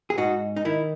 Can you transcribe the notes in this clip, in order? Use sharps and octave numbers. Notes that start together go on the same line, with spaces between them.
G#4
G#2 D#4 F#4
D#4
D#3 E4